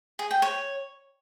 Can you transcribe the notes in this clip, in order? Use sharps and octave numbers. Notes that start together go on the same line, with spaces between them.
G#4
G5
C#5